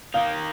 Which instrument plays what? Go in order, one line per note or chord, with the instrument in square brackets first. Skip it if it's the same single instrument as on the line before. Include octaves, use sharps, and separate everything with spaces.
[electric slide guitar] D#3 A#3 D#4 [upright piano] F5